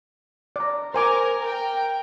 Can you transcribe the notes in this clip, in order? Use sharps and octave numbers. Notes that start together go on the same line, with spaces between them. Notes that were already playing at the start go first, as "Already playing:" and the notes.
D5 A#5
A#4 C5 G#5 D6
A#4 G5